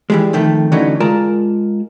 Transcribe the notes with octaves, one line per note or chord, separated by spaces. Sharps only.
E3 G3 G#3
F2 D#3 A3
D3 E3 F#3 A3 C#4 D#4
G#3 F4 A#4 D5 A5 A#5